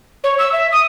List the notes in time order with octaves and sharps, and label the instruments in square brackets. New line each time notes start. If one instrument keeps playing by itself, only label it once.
[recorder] C#5
E6
E5
D#6